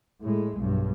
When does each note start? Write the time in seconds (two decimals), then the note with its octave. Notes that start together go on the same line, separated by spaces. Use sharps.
0.21 A2 G#3
0.58 B1 G2